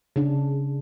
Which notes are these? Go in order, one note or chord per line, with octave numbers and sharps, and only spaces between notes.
C#3 D4